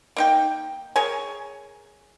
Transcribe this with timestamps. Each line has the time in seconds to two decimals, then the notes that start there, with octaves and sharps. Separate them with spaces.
0.17 A#3 D#4 G5
0.96 G#4 A#4 C#5 G#5